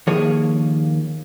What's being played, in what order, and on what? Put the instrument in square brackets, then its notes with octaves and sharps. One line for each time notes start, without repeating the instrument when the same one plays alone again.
[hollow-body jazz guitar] D#2 F3 A#3 G#4 C#5